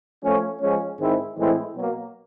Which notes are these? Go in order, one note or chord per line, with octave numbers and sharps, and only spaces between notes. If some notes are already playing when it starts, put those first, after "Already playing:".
F3 A3 C#4
F3 G#3 C#4
G#2 D#3 G#3 C4 E4
A2 E3 G#3 C4 E4
B2 F#3 A#3